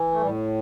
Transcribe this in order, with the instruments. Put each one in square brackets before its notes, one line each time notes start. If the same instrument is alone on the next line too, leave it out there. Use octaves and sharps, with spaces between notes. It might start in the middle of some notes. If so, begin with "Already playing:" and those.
Already playing: [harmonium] E3
A3
A2 G3